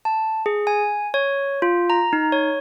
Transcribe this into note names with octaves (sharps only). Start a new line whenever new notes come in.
A5
G#4
G#5
C#5
F4
A#5
D#4
C#5